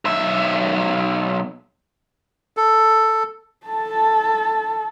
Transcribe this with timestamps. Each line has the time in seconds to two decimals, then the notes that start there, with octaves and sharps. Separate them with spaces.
0.05 B1 E5
2.57 A4
3.66 A4 A5